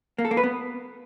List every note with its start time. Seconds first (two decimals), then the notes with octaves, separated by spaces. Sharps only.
0.18 A#3
0.25 A4
0.31 A#3
0.37 B4
0.44 B3